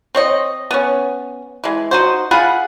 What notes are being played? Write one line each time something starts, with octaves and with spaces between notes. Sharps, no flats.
C4 C#5 D#5
B3 C#4
E3 G#3
D#4 F#4 C5
F4 G#4 F#5 B5